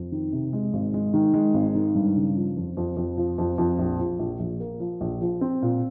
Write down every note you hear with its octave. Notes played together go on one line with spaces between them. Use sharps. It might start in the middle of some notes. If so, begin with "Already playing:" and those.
Already playing: F2
D#3
C3
G#3
G#1
G#3
D#3
G#3
G#1
D#3
G2
C#3
F3
F2
F2
F2
F3
F2
F2
A#1
F3
A#1
A#1
A#3
F3
A#1
F3
C4
A#2